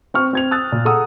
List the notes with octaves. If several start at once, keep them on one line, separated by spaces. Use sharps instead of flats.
C4 C#6 F6
C4 G#6 F7
D#6 E6 F#6 A6
A#2
G#4 A4 F#5 A#5 D#6 E6